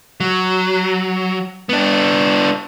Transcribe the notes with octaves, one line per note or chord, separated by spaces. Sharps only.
F#3
B3 D4